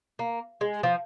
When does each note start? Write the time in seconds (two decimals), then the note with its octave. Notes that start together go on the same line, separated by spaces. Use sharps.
0.19 A#3
0.61 G#3
0.83 F3